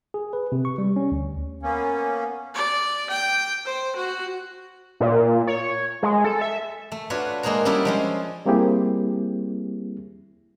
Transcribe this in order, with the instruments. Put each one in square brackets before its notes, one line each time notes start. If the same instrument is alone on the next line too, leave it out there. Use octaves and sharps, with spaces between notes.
[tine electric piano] G#4
B4
C3
C#6
G3
C#4
D2
[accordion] A#3 B3 C#4
[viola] D5
G5
C5
F#4
[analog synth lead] A#2
C#5
G#3
A4
E5
[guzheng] A3
D4 F4 F#4 B4 C#5
G#3 A#3 G#4 C5 A#5
G3 C#4 D4 E4 G4 A4
F3 G#3 C#4
[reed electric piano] G3 A#3 C4 E4 G4 G#4